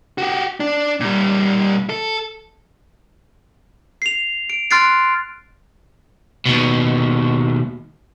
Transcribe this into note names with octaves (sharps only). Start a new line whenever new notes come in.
F#4 G4
D4
A#2 G3
A4
C7 F7
D7
C6 F6 F#6 A6 C7 D7
D#2 B2